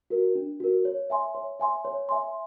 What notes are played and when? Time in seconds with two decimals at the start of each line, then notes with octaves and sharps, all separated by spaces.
0.10 F#4 A#4
0.35 D4
0.60 F#4 A#4
0.85 C#5
1.10 E5 G#5 C6
1.35 C#5
1.60 E5 G#5 C6
1.85 C#5
2.09 E5 G#5 C6